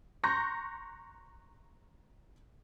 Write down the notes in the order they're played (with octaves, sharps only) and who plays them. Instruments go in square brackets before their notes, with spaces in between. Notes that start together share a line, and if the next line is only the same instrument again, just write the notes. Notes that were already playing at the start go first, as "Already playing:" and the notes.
[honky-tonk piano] A#5 C6 C#6 F#6 G6 A#6